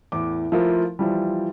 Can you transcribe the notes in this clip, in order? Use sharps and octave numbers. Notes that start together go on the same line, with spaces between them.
E2 A2 D6
F3 A3 E4 F4 A#4
E3 F3 G3